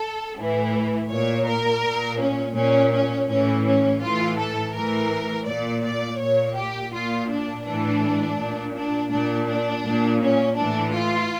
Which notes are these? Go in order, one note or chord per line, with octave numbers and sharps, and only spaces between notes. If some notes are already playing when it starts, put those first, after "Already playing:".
Already playing: A4
A2 E3
A#2 C#5
A#4
A#2
C#4
A#2 C#4
C#4
A2 E3 C#4
C#4
A2 E3 F4
A4
A2 E3 A#4
A#2 D5
D5
A#2 C#5
G4
A#2 F4
D4
A2 E3 D4
A#2
D4
A#2 D4
D4
A#2
C#4
A2 E3 D4
F4